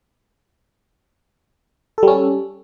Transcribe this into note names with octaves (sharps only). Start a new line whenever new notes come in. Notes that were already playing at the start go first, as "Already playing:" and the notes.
G3 C#4 A4